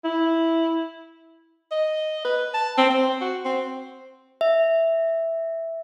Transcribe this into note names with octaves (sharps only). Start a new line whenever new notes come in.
E4
D#5
B4
A5
C4
C4
F#4
C4
E5